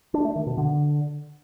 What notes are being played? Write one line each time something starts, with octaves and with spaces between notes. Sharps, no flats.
D4
A3
D#3
B2
D3